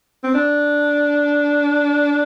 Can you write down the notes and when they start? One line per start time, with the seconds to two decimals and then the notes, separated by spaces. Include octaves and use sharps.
0.24 C4
0.35 D4